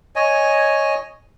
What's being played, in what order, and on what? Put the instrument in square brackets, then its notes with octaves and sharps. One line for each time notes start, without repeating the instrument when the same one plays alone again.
[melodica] C#5 D#5 G#5